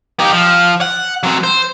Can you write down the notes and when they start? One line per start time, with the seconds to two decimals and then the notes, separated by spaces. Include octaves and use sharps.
0.20 D#4 G4
0.32 F3
0.81 F#5
1.23 F#3 C4
1.44 C5